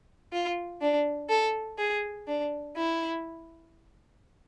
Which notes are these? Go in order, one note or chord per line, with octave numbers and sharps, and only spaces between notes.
F4
D4
A4
G#4
D4
E4